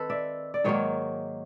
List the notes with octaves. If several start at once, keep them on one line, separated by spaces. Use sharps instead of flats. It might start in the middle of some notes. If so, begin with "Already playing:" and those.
Already playing: D#3 C4 A4 B4
D5 E5
D5
G#2 D#3 F#3 A#3 C#5 D#5